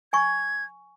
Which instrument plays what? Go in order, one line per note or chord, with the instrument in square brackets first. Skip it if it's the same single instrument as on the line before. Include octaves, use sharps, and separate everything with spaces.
[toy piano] G#5 C#6 [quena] G#6